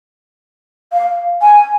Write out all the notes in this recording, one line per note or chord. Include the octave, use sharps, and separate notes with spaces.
F5
G#5